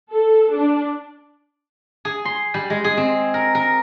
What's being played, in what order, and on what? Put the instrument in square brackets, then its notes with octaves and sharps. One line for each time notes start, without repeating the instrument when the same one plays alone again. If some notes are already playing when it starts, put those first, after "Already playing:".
[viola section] A4
D4
[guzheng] G#4
C6
G3
G#3
G#4
C4
A#4
A#4